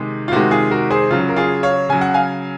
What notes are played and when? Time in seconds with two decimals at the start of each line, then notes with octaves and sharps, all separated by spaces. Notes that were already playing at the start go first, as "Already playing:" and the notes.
Already playing: C3 D#3 G#3
0.28 F4
0.32 C3 D#3 G#3 F#4
0.51 F4 G#4
0.71 F#4 A#4
0.91 G#4 C5
1.11 C#3 F#3 F4
1.29 A#4
1.36 F4 G#4
1.63 C#5 F5
1.89 C#3 F#3 G#5
2.01 F#5
2.14 F5 G#5